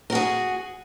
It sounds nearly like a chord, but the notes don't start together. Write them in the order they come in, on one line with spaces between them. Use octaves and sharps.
A#4 F#4 G#4